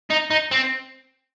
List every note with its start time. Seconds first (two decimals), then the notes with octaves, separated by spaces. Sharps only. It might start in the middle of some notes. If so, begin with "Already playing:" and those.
0.10 D#4
0.31 D#4
0.51 C4